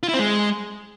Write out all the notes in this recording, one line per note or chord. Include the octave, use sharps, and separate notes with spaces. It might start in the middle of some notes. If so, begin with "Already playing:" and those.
F4
E4
C4
G#3